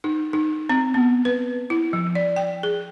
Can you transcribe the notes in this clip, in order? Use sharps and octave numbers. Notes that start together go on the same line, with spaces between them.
D#4
D#4
C4
B3
B4
E4
F3
D5
G5
G#4